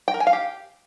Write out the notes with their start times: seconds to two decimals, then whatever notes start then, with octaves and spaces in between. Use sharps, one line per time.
0.08 G5
0.14 A#4
0.20 G#5
0.27 F5
0.33 G4